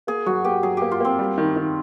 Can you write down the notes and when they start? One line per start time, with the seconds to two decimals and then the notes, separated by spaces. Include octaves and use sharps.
0.07 A#3 G#4
0.26 F#3 F#4
0.44 A#3 G4
0.63 F#3 G#4
0.77 A#3 G4
0.91 F4
1.00 A#3 C4
1.19 G3
1.38 D#3
1.56 D#3